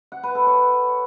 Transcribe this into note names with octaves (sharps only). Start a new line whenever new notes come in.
F#5
B4
A4
C#5